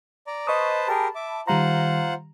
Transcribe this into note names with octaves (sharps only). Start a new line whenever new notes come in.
D5 A#5
B4 C5 D#5 A5 C#6 D#6
G4 G#4 A#4 A5 B5
E5 D6
D#3 G3 F4 C5 F#5 A#5